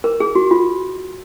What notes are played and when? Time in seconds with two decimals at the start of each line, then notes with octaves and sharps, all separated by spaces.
0.04 A#4
0.20 G#4
0.35 F#4
0.51 F4